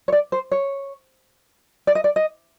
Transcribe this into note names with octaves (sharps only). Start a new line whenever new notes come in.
C#5
D5
C5
C#5
D5
D#5
D5
D#5